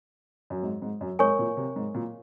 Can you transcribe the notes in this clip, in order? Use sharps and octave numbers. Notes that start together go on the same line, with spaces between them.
F#2
G#2
G#2
F#2
G#2 A#4 C#5 G#5 C#6
A#2
C3
G#2
A#2